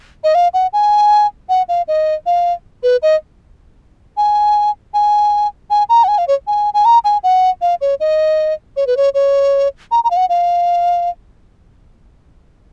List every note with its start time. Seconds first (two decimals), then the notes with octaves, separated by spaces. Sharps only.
0.24 D#5
0.35 F5
0.54 F#5
0.73 G#5
1.49 F#5
1.69 F5
1.88 D#5
2.26 F5
2.83 B4
3.02 D#5
4.17 G#5
4.94 G#5
5.70 G#5
5.89 A#5
6.04 F#5
6.08 G#5
6.18 F5
6.28 C#5
6.47 G#5
6.74 G#5
6.85 A#5
7.04 G#5
7.23 F#5
7.61 F5
7.81 C#5
8.00 D#5
8.76 C#5
8.87 B4
8.97 C#5
9.14 C#5
9.91 A#5
10.04 A#5
10.11 F5
10.17 F#5
10.29 F5